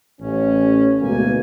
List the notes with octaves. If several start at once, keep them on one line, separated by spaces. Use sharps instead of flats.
A1 C#4
D2 B2 G#3 A#3 D#4 G#5